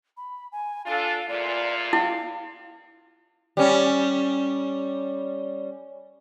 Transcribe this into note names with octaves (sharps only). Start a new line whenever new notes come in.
B5
G#5
D4 F4 A4 F5
E2 A#2 F4 D5
E4 F5
G3 C#4